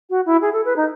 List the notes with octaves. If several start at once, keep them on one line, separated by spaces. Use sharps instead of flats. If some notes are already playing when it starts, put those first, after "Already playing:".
F#4
E4
G#4
A4
B4
D#4